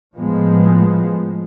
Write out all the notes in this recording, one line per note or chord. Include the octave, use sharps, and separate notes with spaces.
A2 F3 G#3 B3